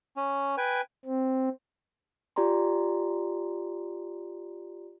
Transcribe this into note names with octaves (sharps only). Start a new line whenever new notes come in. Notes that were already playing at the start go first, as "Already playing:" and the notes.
C#4
B4 G5 G#5
C4
F4 G4 D5 G#5 A#5 C6